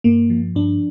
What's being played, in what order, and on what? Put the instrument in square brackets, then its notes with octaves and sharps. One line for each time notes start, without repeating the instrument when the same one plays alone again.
[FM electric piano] G2 A#3
F3
G2 D4